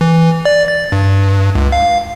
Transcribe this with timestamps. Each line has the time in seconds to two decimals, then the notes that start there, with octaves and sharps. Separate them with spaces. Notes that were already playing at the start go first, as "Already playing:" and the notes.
0.01 E3
0.45 D5
0.68 A6
0.92 G2
1.55 C#2
1.72 F5